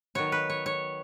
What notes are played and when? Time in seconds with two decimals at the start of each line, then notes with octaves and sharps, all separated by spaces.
0.15 D#3 F#3 B3 C#5
0.32 B4
0.50 C#5
0.66 C#5